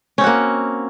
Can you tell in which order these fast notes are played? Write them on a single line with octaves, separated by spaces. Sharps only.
C#4 C4 F#4 A#3